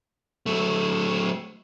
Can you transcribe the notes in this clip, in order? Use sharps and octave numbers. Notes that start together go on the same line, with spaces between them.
F#3 A3